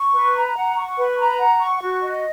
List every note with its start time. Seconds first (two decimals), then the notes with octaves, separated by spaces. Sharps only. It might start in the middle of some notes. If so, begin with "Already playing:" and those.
Already playing: C#6
0.14 B4
0.35 A#5
0.56 F#5
0.76 C#6
0.97 B4
1.18 A#5
1.39 F#5
1.60 C#6
1.82 F#4
2.02 D#5